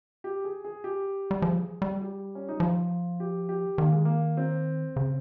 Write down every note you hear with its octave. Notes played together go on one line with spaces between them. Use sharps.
G4
G#4
G#4
G4
G3
F3 G#4
G3
G4
C#4
D#4
F3 F4
G4
G4
D#3 A#3
G#3
A#3
C4
C#3